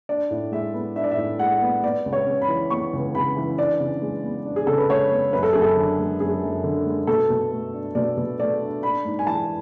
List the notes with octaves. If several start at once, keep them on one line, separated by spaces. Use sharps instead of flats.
D4 D5
A2
G#3 E5
B3
D4 E5
D5
E5
A2
G#3 F#5
B3
B3 D5
C#2
C#5
C#3
B5
E3
B3 C#6
C#2
C#3 B5
E3
D4 D5
C#3
G#3
B3
D4
G#4
C#3 A4
B4
G#3 C#5
B3
F#2 B4
A4
F#2 G#4
A4
D3
G#3
F#2 G#4
F#2
D3
G#3
B2 A4
B2
A3
D4
B2 D5
B2
A3 D5
D4
D4 B5
G#2
G#5
E3 A5